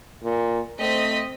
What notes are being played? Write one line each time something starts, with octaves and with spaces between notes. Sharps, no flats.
A#2
A3 C4 D#5 B6